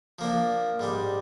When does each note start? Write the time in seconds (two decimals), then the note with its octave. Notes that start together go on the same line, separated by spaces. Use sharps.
0.19 F3 A#3 D4
0.80 G#2 G3 D4